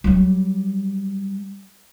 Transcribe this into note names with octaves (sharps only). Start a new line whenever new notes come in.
F#3 G3